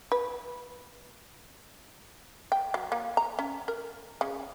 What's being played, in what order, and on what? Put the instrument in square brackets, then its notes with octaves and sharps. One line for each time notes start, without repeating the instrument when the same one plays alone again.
[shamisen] B4
G5
F#3
A#3
A#5
C#4
A#4
C#3